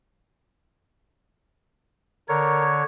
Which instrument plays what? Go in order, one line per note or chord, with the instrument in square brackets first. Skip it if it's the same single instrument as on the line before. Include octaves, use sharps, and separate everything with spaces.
[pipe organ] D3 C#5 [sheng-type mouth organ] A#4